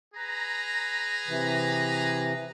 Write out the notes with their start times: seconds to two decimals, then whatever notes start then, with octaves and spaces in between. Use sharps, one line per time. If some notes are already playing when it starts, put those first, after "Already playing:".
0.14 G#4 B4 A#5
1.28 C3 E3